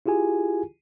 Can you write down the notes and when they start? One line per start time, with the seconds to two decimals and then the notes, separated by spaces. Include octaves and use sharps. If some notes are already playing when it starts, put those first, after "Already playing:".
0.06 E4 F4 G4 G#4 G#5